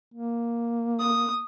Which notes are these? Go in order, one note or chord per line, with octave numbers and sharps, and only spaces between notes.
A#3
D#6